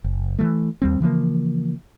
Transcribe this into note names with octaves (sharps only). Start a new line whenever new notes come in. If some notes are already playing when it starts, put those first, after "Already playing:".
F#1
E3 F#3 A3
D#2 G3 C4
C#3 E3 F3 A#3